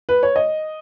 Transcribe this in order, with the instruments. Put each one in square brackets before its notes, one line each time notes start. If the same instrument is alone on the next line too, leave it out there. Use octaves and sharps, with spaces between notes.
[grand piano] B4
C#5
D#5